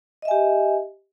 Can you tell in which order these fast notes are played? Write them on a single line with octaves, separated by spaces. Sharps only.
D#5 E5 G#5 G4